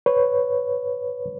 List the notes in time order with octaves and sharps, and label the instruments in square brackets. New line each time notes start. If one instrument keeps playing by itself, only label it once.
[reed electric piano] B4 C#5